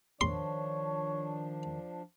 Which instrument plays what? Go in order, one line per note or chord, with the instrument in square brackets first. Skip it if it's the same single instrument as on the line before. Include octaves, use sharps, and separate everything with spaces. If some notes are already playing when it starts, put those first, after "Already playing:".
[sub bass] D#3 [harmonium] F3 D4 [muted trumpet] C#5 [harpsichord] C6